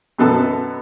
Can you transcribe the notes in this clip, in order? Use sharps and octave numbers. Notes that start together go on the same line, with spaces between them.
F#2 B2 B3 A4 A5